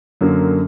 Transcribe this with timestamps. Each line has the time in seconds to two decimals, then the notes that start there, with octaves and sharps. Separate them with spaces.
0.21 F#2 D3 F#3 A#3